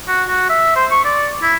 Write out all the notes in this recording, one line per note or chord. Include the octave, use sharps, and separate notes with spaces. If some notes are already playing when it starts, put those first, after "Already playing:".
F#4
F#4
E5
C5
C#6
D5
E4